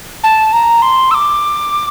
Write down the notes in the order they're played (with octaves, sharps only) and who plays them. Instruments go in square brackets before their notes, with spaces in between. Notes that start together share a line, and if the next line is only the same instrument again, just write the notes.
[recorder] A5
A#5
C6
E6
D6